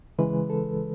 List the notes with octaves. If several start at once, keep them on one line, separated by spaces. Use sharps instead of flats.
C#3 E3 G#3 B4
A4